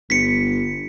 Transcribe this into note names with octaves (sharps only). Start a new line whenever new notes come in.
G1 B6 C#7